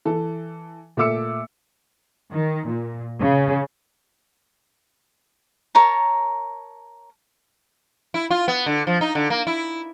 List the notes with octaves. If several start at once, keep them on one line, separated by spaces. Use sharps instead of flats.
E3 A4
A#2 A3 E5 D6 E6 C#7
D#3
A#2
C#3
A#4 C#5 A5 A#5
E4
F4
B3
D3
F3
D#4
D3
A#3
E4